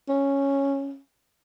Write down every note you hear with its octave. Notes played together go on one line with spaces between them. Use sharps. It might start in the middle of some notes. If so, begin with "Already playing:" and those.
C#4